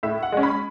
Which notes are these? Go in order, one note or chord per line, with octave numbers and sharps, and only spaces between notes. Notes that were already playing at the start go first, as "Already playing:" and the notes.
A2 E5
F#5
G#3 C#4
B5